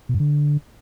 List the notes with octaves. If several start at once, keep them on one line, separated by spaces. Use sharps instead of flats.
B2
G2
D3